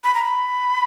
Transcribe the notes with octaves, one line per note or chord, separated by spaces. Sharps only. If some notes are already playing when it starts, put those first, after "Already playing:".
B5
A#5
B5